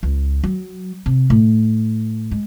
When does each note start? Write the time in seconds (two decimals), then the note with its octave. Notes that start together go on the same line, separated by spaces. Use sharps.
0.03 C#2
0.44 F#3
1.06 C3
1.30 A2
2.31 G#3